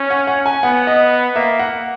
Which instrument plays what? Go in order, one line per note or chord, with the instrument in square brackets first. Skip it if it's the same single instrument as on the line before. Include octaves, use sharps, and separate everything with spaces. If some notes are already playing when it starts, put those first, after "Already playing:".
Already playing: [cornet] C#4
[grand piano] F#5
F#5
G#5
[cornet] B3 [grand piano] F#5
[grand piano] D#5
[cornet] A#3 [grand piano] E5
[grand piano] F#5